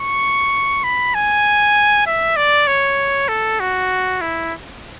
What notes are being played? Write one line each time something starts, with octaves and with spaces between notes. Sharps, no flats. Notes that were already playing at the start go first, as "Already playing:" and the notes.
Already playing: C#6
B5
G#5
E5
D5
C#5
A4
F#4
E4